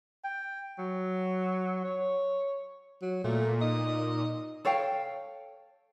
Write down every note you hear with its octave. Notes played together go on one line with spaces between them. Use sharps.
G5
F#3
C#5
F#3
A#2 A3
D#4 D#5
A4 C#5 F5 G5